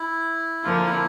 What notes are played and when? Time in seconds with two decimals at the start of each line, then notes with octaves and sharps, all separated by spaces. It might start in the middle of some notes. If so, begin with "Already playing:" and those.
Already playing: E4
0.64 F2 D3 F3 A#3 F4
0.86 E4